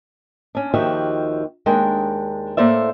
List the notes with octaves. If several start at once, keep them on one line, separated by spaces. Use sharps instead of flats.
C#4 D4
D#2 D#3 F3 F#4 G4 E5
D#2 G#3 D4 A#4 G5
A2 A#3 A4 C5 D5 E5